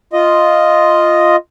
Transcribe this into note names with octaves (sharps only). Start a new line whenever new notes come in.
F4 D#5